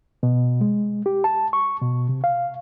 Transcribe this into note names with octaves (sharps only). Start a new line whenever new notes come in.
B2
G#3
G4
A5
C#6
B2
C3
F5